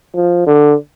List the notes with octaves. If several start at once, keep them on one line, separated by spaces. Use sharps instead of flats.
F3
D3